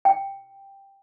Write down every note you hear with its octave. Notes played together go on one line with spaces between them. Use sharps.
G5